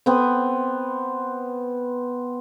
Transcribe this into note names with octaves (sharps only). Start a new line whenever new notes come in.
B3 C4